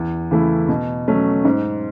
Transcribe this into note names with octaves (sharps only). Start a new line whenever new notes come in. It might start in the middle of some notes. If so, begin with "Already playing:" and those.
Already playing: E2
C#3 E3 A3 E4
B2
F#3 A3 C#4
G#2